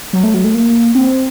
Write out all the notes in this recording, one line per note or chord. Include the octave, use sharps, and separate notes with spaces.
F#3
A3
F#3
A3
A#3
C4